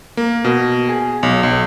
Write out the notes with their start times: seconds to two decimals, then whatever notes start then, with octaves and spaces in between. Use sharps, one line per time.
0.17 A#3
0.45 B2
0.89 G#4
1.23 B1
1.43 B1